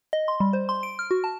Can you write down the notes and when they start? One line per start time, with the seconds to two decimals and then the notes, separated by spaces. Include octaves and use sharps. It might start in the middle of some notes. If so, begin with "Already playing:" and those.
0.13 D#5
0.28 C6
0.40 G3
0.53 C5
0.69 C6
0.83 D7
0.99 F6
1.11 F#4
1.24 A5